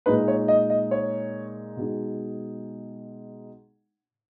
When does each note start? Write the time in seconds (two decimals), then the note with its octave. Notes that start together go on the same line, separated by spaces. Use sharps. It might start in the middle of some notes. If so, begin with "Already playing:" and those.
0.06 A#2 G#3 D#4 B4
0.28 C#5
0.48 D#5
0.70 D#5
0.91 C#5
1.77 B2 G#3 D#4